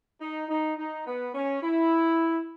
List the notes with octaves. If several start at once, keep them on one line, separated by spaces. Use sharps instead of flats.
D#4
D#4
D#4
B3
C#4
E4